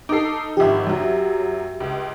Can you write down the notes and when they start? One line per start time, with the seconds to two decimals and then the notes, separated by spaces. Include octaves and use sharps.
0.09 D#4 A4 D6 C7
0.57 G#1 F3 G4 E5
0.87 F#2 F#3
1.80 C#2